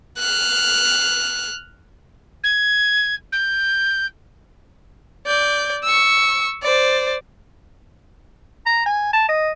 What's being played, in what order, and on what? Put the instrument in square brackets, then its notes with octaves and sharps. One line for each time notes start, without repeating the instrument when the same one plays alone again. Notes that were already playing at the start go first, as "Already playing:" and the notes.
[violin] F6 F#6
[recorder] G#6
G6
[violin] D5 G6
C#6 E6
C5 D5
[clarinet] A#5
G#5
A5
D#5